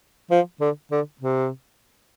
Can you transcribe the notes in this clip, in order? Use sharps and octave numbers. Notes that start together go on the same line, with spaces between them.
F3
D3
D3
C3